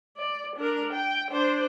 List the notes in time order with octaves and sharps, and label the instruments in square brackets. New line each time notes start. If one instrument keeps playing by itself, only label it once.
[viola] D5
D4 A#4
G5
D4 C5